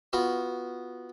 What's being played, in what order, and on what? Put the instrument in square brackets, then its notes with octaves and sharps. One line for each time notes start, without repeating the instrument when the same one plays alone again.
[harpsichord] B3 F4 F#4